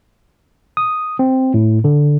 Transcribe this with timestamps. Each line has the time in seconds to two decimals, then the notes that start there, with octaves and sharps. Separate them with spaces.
0.77 D#6
1.19 C4
1.54 A2
1.84 D3